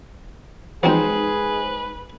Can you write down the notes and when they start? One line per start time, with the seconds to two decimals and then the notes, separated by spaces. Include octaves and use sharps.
0.83 F3 F#3 G#3 C4 D#4 G#4 B4 C5